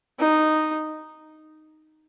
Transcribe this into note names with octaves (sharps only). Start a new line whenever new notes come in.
D#4